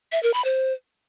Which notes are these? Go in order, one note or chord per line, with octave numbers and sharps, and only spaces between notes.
E5
A#4
B5
C5